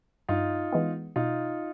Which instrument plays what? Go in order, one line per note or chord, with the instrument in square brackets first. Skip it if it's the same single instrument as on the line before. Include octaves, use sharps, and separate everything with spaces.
[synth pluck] G2 [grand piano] D#4 F4
[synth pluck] E3 G#3 B3
[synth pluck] B2 [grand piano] D#4 F4